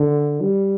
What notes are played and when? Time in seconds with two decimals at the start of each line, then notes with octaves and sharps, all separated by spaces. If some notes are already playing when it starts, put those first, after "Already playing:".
Already playing: D3
0.42 G3